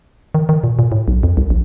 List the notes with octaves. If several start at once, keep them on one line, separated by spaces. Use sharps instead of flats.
D#3
D#3
A#2
A#2
A2
B1
F2
C2
A#1